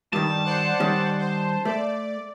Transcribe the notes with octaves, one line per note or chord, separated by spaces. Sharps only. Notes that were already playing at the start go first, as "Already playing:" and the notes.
G2 D#3 G3 A5
C5 D5 F#5
D#3 G3 C#4
C5
A3 D5